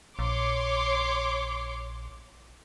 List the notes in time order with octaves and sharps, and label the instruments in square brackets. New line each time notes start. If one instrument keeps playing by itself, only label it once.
[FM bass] A#1 [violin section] C#5 C6 D6